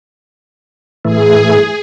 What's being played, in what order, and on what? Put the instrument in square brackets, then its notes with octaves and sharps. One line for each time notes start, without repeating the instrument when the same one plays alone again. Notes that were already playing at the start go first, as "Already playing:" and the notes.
[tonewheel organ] A2 E3 A3 [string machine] G#4